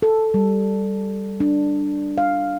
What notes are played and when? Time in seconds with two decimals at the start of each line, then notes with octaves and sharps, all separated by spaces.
0.02 A4
0.34 G3
1.40 D4
2.18 F5